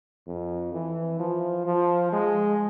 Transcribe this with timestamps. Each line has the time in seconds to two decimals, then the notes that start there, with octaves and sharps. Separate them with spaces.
0.27 F2
0.73 E3
1.20 F3
1.66 F3
2.13 G#3